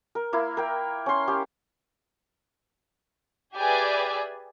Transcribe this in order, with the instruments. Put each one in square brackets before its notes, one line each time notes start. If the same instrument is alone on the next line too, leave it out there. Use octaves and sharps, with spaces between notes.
[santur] A#4
A#3 E4 F5
A#4 G5
C#4 C6
C#4 G4
[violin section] G4 G#4 B4 D5 E5 G#5